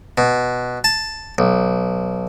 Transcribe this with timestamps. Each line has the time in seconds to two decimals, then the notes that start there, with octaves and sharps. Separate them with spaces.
0.18 B2
0.84 A5
1.38 B1